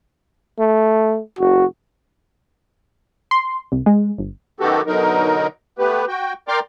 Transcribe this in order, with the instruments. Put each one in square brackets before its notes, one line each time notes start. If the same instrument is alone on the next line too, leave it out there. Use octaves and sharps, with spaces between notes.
[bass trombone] A3
[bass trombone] F#1 [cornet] F#4
[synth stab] C6
C2
G#3
G1
[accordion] F#2 D#3 B3 F#4 G4 A4
B2 D3 F#3 D#4 A#4
A3 B3 G4 B4
F#4 G5
A#4 D5 G5 C6 D6 F6